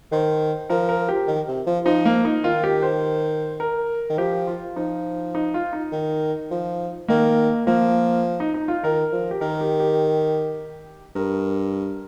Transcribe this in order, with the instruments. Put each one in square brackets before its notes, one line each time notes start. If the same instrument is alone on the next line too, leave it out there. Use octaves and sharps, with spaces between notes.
[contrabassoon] D#3 [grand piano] C5
[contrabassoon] F3 [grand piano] A#4
[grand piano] A#4
G4
[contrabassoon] D#3
C3
F3
[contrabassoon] F3 [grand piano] D#4
[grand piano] A#3
D#4
[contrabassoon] D#3 [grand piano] F4
[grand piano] G4
C5
A#4
[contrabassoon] D#3
[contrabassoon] F3 [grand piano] G4
[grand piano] F4
[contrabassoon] F3 [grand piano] D#4
[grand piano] D#4
F4
D#4
[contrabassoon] D#3
F3
[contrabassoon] D#3 [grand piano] A#3
[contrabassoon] F3 [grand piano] A#3
[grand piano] D#4
D#4
F4
[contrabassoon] D#3 [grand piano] A#4
[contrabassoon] F3
[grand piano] G4
[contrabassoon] D#3 [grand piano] A#4
[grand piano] G4
G4
[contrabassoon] G2 [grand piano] A#4